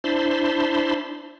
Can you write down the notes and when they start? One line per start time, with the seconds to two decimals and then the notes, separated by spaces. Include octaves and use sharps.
0.04 D4 E4 C5 A5 B5 C6